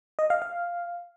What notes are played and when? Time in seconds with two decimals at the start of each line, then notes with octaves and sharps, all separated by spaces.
0.19 D#5
0.30 F5
0.42 F5